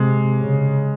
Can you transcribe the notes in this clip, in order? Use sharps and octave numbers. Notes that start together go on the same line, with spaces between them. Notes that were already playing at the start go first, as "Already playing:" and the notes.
Already playing: C3 G#3
C#3